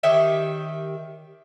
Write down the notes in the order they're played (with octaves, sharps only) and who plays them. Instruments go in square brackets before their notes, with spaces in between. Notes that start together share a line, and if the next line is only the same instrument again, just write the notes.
[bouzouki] D#3 G4 C#5 E5